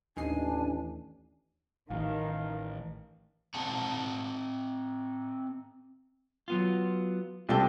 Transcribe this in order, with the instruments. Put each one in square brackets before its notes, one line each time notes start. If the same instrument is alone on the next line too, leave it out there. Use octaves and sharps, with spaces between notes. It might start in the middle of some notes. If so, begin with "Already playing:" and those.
[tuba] A1 [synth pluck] D#2 D#4 C7 [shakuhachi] D4 [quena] G#5
[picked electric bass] A1 [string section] D#3 [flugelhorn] F5
[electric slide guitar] C4 G#4 F#5 A5 A#5
[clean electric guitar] F#3 B3 F4
[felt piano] C2 F4 A4 [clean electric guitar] C4 D5 G5